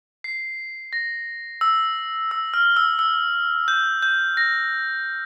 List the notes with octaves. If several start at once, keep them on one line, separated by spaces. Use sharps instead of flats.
C7
A#6
E6
E6
F6
E6
E6
G6
G6
A#6